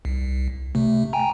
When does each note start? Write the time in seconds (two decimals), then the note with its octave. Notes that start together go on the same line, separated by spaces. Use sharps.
0.05 C2
0.75 C3 A3
1.13 G5 G#5 A#5